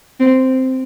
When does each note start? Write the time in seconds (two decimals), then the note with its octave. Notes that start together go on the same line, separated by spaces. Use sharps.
0.20 C4